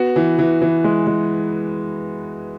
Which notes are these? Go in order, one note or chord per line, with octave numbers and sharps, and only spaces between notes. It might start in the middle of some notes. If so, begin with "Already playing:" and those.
Already playing: B3 F#4
E3
E3
E3
G#3
G#3